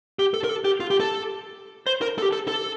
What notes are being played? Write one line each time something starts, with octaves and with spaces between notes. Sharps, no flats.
G4
A4
A#4
A4
G4
F4
G4
A4
C5
A#4
A4
G4
A4
A4